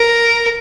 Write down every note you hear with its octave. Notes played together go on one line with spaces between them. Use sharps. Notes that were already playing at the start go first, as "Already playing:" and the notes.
Already playing: A#4